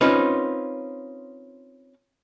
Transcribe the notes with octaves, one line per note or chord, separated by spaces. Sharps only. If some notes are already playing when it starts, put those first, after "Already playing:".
C4 C#4 D#4 F4 B4